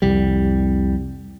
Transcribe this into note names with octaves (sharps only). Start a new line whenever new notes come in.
C2 F2 G3